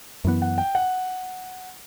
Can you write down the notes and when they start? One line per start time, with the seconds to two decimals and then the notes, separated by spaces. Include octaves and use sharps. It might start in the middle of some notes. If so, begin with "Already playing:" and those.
0.25 F#2 E3 B3
0.42 F#5
0.58 G5
0.75 F#5